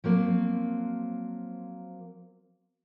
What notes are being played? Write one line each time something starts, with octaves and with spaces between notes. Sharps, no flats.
F3 F#3 A#3 C4